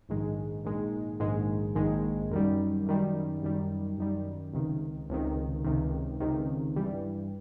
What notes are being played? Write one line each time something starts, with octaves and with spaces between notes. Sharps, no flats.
A#1 G#2 D#3 G#3
A#1 G#2 D#3 G#3
A#1 G#2 D#3 G#3
A#1 G#2 D#3 G#3
F#2 D#3 G3
F#2 D#3 G3
F#2 D#3 G3
F#2 D#3 G3
C#2 C3 D#3
C#2 C3 D#3
C#2 C3 D#3
C#2 C3 D#3
G2 E3 G3